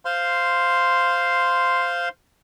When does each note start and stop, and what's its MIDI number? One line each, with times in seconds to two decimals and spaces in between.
0.05 2.09 72
0.05 2.09 77
0.05 2.09 84